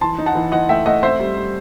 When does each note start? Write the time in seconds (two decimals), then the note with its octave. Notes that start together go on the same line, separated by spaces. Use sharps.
0.01 E3 A5 C6
0.18 D#4
0.26 F#5 A5
0.35 E3
0.52 E3 D#5 F#5
0.69 A3 E5 G5
0.86 A3 D#5 F#5
1.03 C4 C5 E5
1.20 G3
1.37 G3